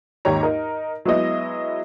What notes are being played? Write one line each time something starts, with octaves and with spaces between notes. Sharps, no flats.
D#2 G#2 G4 C#5 A#5
D#4 A#4
F#3 G#3 B3 E4 D#5